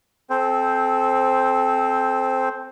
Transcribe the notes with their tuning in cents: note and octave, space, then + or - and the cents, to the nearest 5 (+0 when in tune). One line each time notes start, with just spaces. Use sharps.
C4 +5 A4 -25 C5 +0